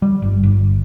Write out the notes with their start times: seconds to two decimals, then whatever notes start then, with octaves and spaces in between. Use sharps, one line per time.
0.02 G3
0.22 G1
0.43 G1